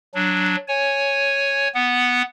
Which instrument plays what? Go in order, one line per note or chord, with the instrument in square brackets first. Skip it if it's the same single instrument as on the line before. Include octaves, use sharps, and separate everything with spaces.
[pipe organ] F#3 D4
C#5 G#5
B3 F#5